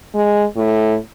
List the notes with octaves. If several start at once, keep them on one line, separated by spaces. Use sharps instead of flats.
G#3
A2